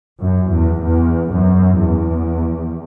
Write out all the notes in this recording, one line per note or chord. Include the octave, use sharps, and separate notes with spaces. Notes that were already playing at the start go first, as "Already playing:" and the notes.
F#2
E2
E2
F#2
E2